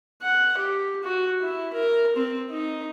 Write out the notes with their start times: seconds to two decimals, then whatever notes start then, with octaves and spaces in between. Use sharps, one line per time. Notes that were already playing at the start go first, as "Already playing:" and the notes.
0.22 F#5
0.58 G4
1.03 F#4
1.41 E4
1.73 A#4
2.16 C4
2.51 D#4